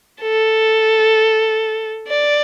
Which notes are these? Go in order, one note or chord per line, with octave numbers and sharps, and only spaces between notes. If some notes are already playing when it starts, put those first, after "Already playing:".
A4
D5